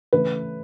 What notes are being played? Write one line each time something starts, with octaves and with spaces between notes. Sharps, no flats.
C#3 E3 A3 B4